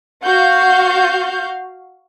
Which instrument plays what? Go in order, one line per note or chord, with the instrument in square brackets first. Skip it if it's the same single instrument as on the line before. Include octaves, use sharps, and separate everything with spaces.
[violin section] F#4 F5 G6